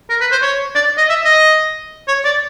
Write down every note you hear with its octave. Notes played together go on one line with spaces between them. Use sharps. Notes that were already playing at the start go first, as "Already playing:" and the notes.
A#4
B4
C5
C#5
D5
D#5
E5
D#5
C#5
D5